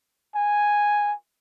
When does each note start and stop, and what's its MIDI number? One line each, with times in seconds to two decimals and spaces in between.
0.36 1.14 80